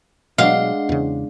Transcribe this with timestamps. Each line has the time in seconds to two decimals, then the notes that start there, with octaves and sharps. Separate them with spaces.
0.38 B2 F#3 G#3 D4 D#5 F5 F#5 C7
0.89 E2 C#3